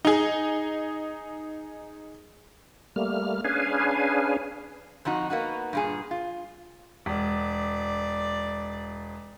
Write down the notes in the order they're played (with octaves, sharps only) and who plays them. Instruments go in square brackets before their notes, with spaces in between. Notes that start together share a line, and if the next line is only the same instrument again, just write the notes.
[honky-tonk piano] D#4 G#4
[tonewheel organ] G3 A3 A#3 F6
C#4 D4 G#4 B4 F5 G#5
[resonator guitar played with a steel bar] F2 F3 D#4 F#4
A#3 B3 D#4 F#4
G2 A#2 G#4
F4
[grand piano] E1 [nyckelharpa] D5